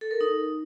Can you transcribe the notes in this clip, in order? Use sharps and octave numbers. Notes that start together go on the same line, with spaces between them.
A4
A#4
D#4